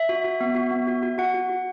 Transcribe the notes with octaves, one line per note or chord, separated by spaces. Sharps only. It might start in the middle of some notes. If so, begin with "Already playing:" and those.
Already playing: E5
F#4
F#4
B3
F#4
B3
F#4
F#4
F#4 F#5
F#4
F#4